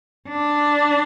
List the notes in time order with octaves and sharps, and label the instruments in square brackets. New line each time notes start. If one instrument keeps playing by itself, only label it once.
[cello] D4